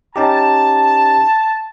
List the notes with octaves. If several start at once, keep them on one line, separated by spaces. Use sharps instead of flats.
C#4 D#4 G4 A5